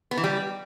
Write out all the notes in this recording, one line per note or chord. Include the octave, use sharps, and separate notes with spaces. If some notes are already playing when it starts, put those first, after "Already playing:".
B3
E3
G3